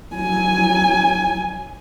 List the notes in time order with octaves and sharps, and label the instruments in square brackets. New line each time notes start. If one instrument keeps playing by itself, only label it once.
[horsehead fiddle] F#3 G#5